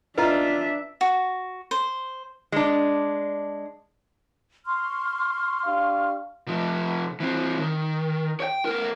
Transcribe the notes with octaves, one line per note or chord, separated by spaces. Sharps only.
D4 F4 B4 D#5 E5 A#5
F#4
C5
G#3 D4
C6 C#6 F6
D4 G4 F5
C3 F3
E3 C4
D#3
C#5 G5
B3 A#4